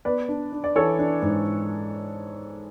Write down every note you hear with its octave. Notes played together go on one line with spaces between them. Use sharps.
B3 B4 D5
D4
D4
D5
E3 A4 C#5
D4
G#2